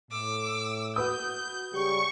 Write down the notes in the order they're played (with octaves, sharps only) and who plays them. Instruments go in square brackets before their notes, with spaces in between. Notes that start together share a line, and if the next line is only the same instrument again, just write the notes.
[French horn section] A2 [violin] D6 E6
[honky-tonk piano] F#4 B4 D#6 [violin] G6
[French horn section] C#3 G3 [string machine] C#6